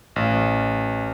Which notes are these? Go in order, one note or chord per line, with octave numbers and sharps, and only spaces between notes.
A1